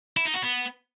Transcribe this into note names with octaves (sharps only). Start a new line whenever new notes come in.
E4
D#4
F#4
B3